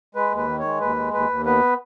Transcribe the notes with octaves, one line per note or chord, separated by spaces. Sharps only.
G#3 B4
D#2
B4
D#3
C#5
G#3
D#2 B4
G#3
D#2 B4
D#2
B3 B4